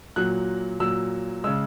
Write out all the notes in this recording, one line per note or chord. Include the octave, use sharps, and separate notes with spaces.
A#2 F#3 F#6
A#2 F#3 E6
C#3 G#3 E6